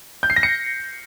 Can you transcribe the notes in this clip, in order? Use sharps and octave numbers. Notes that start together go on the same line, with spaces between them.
G6
C7
A#6
C#7